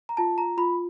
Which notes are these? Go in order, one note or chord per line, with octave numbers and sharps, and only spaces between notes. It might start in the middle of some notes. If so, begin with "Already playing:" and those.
A#5
F4 A5
A#5
F4 B5